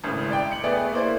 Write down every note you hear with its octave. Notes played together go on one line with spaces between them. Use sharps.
G#1 A2 C#3
D5 G5
C#7 F#7
A3 B3 G#4 B4 D5
A#3 E4 C5 D5